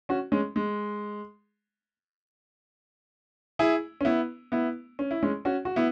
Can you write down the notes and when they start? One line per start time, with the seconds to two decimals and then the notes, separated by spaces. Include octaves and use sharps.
0.09 C#4 F#4
0.32 G#3 C#4
0.56 G#3
3.59 E4 G#4
4.01 C#4
4.05 B3 E4
4.52 B3 E4
4.99 C#4
5.11 E4
5.23 G#3 C#4
5.45 C#4 F#4
5.65 F#4
5.76 B3 E4